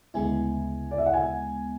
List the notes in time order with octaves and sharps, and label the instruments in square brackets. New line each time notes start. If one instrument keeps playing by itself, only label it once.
[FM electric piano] D2 C#3 G#3 B3 E4 [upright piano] G#5
[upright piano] D5
E5
F#5
G#5